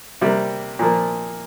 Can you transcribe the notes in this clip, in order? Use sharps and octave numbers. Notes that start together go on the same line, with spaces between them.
C3 G3 A#3
A#2 F3 A#3